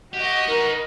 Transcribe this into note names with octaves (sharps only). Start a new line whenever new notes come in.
F#4 G4 D#5
D#4 A#4 B4